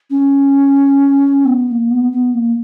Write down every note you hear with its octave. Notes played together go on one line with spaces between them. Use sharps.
C#4
B3
B3
A#3
B3
B3
A#3